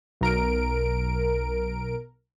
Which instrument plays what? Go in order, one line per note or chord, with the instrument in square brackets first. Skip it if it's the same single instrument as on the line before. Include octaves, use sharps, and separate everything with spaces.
[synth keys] B1 A#4 D7